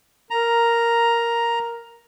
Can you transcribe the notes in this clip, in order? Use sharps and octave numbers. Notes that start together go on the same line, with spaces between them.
A#4 A#5